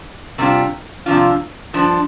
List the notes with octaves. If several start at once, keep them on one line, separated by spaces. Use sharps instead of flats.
C3 G3 D4 F4
C3 F3 D4 F4
G2 F3 D4